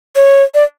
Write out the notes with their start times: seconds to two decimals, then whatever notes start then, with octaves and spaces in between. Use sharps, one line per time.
0.16 C#5
0.55 D5